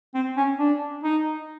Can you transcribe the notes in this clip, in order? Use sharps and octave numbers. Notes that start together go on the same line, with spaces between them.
C4
C#4
D4
D#4